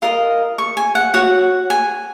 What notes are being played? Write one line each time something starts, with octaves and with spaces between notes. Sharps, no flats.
F4 A#4 D#5
C#6
G#5
F#5
F#4 C#5 F#5
G#5